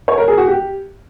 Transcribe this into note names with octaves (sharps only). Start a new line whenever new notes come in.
C#5
A#4
G#4
F#4
G4